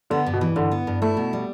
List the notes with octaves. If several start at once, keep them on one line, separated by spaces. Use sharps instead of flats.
D3 B3
G2
B2
E3
G2 D3
B3
G2
A3 E4
B2
G3